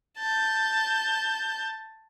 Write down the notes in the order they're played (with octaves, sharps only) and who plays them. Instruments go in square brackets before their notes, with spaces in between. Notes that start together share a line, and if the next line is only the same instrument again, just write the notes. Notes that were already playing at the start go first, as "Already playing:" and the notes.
[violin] A5 G6